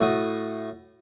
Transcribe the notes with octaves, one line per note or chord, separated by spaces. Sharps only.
A2 F#4 D#6